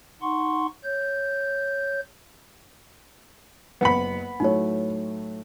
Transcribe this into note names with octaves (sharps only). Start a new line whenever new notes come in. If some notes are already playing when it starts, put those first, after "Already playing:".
D#4 F#5 C6 C#6
C#5 G6
F#1 B3 B5 C#7
A2 F#3 A3 D#4 C#5